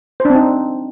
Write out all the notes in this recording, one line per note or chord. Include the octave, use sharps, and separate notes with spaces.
C5
D4
C4
D#4